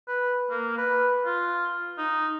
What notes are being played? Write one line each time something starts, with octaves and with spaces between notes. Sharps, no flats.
B4
A#3
B4
F4
D#4